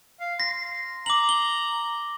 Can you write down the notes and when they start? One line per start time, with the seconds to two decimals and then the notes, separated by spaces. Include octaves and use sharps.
0.20 F5
0.40 C6 A#6
1.06 A#5 D6 F#7
1.29 G7